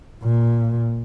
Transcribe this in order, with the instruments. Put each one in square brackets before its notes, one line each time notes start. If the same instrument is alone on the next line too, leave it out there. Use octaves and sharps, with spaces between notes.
[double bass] A#2